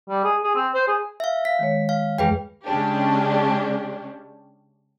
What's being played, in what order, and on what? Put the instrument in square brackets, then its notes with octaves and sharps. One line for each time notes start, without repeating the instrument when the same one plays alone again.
[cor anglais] G3
G#4
G#4
C4
C5
G#4
[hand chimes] E5 F5
[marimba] F5 [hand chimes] B6
[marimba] D#3 G#3 C#5
[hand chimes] F5
[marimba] F2 E3 G#3 [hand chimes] G#4 B4 G5
[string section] C#3 G#3 C#4 D4 G4